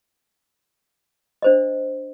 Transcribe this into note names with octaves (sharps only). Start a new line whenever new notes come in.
D4 C5 D#5